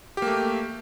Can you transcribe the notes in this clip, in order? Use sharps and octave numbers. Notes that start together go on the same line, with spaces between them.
A3 A#3 G4